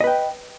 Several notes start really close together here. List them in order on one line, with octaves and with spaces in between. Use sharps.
D#5 B4 G5